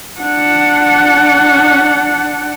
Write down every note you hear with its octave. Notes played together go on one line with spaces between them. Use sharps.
D4 F#5